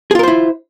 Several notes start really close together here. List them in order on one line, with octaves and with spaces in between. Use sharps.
G#4 F4 A#4 C5 E4